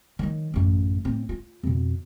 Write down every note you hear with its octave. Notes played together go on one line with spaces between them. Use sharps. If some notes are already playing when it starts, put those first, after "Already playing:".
D#3 F#3
A1 F#2
A2 C4
F4
F2 B2